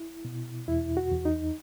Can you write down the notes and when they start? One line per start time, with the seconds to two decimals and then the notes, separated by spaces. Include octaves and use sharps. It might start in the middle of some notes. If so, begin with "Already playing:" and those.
Already playing: E4
0.25 B2
0.68 E2 E4
0.97 F#4
1.11 E2
1.25 D#4